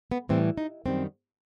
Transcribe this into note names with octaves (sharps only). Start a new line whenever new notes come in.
B3
A2 E3 G3 C4
D#4
F#2 D#3 G3 C4